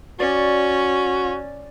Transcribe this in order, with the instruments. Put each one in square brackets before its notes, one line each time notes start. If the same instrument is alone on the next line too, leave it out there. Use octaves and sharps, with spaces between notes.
[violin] C#4 [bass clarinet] F#4 [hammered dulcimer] D5